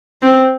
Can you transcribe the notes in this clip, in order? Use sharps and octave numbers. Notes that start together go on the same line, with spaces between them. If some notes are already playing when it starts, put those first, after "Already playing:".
C4